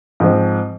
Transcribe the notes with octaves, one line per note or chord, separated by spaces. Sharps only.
G#2 F3 G#3 C4